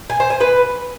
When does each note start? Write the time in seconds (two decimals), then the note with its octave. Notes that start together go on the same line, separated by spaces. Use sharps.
0.10 G#5
0.20 C5
0.30 G#5
0.41 B4